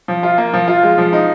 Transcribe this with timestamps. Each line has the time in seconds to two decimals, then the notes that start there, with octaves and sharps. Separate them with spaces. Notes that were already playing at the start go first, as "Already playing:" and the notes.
0.08 F3
0.23 F4
0.38 A#3
0.53 F3
0.68 F4
0.83 G#3
0.98 F3
1.13 D#4